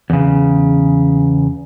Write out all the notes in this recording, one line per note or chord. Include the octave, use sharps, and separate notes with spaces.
E2 C#3